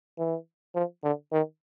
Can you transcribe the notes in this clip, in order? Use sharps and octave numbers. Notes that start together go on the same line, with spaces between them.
E3
F3
D3
D#3